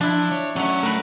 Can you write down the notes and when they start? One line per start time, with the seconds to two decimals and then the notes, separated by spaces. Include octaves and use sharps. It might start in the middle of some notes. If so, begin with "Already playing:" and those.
0.01 F3 D4 E4
0.32 C#5
0.56 F#3 A3 C#4
0.83 A3 A#4 B4